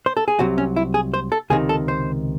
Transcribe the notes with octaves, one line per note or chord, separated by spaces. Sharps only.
C5
A4
G#4
C2 C3 F#3 F#4
C#4
E4
G#4
C5
A4
C#2 C3 D#3 G#4
A4
C5